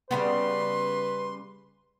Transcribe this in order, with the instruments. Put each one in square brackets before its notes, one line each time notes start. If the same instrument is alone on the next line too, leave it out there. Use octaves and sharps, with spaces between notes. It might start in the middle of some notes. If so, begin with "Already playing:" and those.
[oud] C#3 G3 B3 [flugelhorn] B4 [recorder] C6